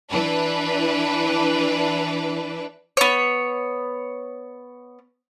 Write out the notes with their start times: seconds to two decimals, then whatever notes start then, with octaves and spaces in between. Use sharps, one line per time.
0.11 E3 D4 B4
2.97 B3 C#5